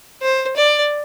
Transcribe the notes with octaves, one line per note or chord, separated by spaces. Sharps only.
C5
D5